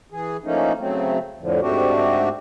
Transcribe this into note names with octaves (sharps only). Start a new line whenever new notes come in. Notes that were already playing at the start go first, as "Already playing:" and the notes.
E3 G#4
E3 F3 A3 A#3 C#4 D#4
C#3 F#3 A3 C4
F2 A2 D3 F3
G#2 A3 C4 D4 F#4 G4